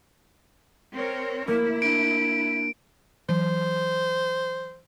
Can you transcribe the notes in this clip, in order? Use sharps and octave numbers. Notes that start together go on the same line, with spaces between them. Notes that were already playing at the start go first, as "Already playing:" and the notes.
C4 A#4 C#5
A#3 E4 A#4
D4 D7
E3 F#3 C5